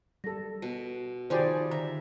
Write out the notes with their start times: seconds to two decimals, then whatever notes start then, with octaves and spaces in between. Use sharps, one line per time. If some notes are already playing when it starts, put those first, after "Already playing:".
0.24 G3 A4 A#6
0.62 B2
1.30 C3 D#3 F3 G3 D#4 G#4 C5 D5
1.71 D3 E5 A#5